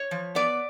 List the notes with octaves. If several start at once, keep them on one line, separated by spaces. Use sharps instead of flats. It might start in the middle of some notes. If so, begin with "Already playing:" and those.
Already playing: C#5
F3
B3 D5